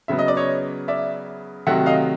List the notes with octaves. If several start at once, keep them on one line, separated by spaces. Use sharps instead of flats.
C#3 F#3 B3 E5
D#5
D5
C#5 D#5
D5 E5
C3 D#3 F#3 A3 E5 F#5
D#5 F5